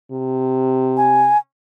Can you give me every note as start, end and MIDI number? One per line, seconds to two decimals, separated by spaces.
0.12 1.32 48
0.97 1.38 80